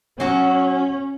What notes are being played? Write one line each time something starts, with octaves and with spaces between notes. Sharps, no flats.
F#3 C#4 F#4